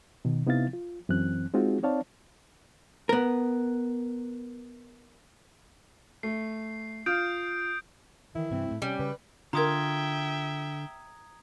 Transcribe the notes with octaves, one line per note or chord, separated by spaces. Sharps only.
B2 D#3
C3 B3 D#4 E4 F5 A6
F4
F#2 E3 C4 F#6
G#3 C4 D#4 F4 F#4 G#4
C4 D#4 C#5 D5 F5 A5
B3 A#4
A3 C7
F4 D#6 G6 D7
D#3 E3 E4
G2 C3 E3 C4
A2 A3
C3 G3 C#4
C#3 B4
D3 F4 A#4 E5 G5 A#5 D#6 G#6